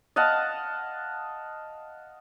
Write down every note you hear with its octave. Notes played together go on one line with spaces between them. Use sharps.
D#5 F5 F#5 A5